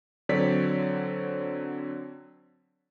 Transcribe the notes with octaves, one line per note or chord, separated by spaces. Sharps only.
D3 F#3 C4 C#5 D5 B6